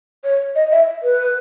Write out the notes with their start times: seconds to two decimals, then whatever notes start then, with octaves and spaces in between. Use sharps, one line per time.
0.24 C#5
0.55 D#5
0.72 E5
1.03 B4